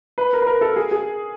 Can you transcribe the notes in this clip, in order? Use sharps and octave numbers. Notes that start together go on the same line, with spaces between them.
B4
A#4
B4
A#4
A4
G#4
G#4